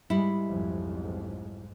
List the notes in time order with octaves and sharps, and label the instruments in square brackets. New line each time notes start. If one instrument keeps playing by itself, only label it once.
[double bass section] G#2 G#3 [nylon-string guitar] G3 E4
[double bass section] B1 F2 G#2